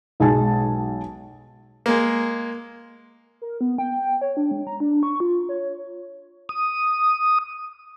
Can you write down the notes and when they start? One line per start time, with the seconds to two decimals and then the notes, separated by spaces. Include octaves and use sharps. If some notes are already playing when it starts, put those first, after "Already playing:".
0.20 B1 G#3 G#5 A5
1.86 G#3 A#3
3.42 A#4
3.61 B3
3.78 G5
4.22 C#5
4.37 D4
4.51 G#3
4.67 A#5
4.80 D4
5.03 C#6
5.20 F4
5.49 C#5
6.49 D#6